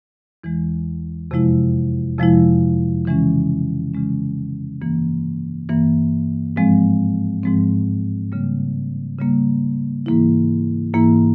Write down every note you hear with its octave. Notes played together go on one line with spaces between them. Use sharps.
E2 E3 G#3
F2 C3 F3 G#3 E4
F2 C3 F3 G#3 E4
C#3 E3 G#3 C#4
C#3 E3 G#3 C#4
G2 E3 A#3
G2 E3 A#3
G#2 F3 G#3 C4
G#2 F3 G#3 C4
C#3 G3 A#3
C#3 G3 A#3
G#2 E3 A#3 E4
G#2 E3 A#3 E4